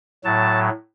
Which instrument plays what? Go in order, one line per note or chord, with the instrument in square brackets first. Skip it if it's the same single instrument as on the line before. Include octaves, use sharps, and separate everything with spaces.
[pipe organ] A2 F#3 A5